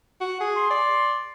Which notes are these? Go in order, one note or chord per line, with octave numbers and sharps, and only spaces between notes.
F#4
G#4
C6
D5